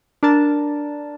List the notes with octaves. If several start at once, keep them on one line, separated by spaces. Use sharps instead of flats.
D4 A#4 A5